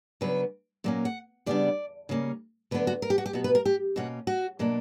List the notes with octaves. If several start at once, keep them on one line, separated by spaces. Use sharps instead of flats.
C#3 F#3 B3 D4 B4
A#2 F#3 A#3 C#4
F#5
C#3 G3 B3 D4 D5
C#3 G3 A#3 C#4
D3 F#3 B3 D4 B4
F#4
A#4
G4
F#4
G4
B2 F#3 B3 F#4
B4
A#4
G4
B2 A#3 C#4 F#4
F#4
B2 F#3 A#3 D4